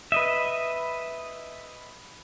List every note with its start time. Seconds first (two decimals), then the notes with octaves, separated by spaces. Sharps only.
0.12 B4 D#5 E5